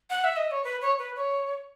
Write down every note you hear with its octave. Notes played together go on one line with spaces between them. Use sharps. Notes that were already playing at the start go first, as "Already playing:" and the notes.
F#5
E5
D#5
C#5
B4
C#5
B4
C#5